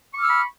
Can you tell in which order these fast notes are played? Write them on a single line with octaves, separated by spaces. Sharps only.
C#6 D6 F6 E6 B5